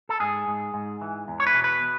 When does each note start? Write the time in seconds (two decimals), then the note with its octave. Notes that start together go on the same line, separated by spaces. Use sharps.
0.09 A4
0.20 G#2 G#4
0.48 G#2
0.74 G#2
1.01 E3
1.28 E2
1.40 C#5
1.47 B4
1.55 B2
1.64 B4